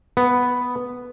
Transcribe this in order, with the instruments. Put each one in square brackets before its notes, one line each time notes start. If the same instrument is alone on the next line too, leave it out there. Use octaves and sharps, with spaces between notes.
[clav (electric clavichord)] B3